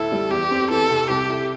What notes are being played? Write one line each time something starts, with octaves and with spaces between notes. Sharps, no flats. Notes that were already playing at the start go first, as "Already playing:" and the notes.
Already playing: D2 A2 E4 A4 C5
G3
E2 G4
C4
E3 A4
C3
C2 G4
E4